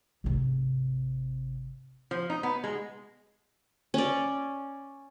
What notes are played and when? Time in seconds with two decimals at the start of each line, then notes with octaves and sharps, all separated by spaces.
0.24 G#1 C3
2.11 F3
2.30 D#4
2.43 B3
2.64 G#3
3.94 C#4 D5